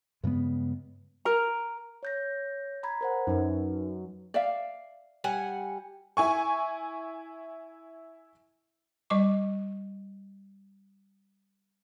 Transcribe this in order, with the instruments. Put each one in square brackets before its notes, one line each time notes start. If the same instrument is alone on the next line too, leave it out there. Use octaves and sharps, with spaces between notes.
[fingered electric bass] G2 C#3 G#3 B3
[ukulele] A#4 A#5
[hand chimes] C#5 G6 A#6
A#5 B5 G#6
A#4 C5 F#5
[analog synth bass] F#2 [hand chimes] D#4 B4
[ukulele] D5 E5 F5
[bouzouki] G3 F#5 G#5
[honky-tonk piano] E4 G#5 C#6
[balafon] G3 D#5 C#6 D6